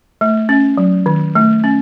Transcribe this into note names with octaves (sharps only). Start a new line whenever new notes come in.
A3
C#4
F#3
D#3
A3
C#4